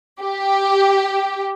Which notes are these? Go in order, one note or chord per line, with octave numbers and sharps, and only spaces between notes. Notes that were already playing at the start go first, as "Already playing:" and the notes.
G4